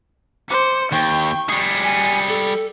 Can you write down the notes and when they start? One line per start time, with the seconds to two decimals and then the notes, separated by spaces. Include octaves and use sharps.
0.50 C5 D6 C#7
0.92 D#2 G5 C#6
1.49 G3 G#4 C#7
1.84 G#5
2.28 A4